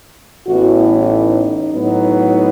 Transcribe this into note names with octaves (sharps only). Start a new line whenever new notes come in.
A1 A2 E3 B3 F#4
E4
D#4
A2 F#3 B3 D#4